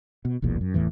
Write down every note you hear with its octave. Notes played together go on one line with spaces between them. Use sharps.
B2
F1 B1 E2 A#2
F#2
F1 E2 A2 E3